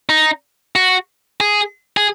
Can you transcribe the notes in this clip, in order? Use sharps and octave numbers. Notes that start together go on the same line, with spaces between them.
D#4
F#4
G#4
G#4